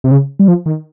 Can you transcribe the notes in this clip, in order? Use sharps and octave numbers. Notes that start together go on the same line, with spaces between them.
C3
C#3
G3
F3
D#3